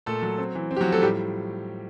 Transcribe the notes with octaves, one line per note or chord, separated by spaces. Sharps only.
A#2 A3 A4
F#3
C4
E3
C4
G4
F#3 F#4
F3
A3 A4
A2 G3 G4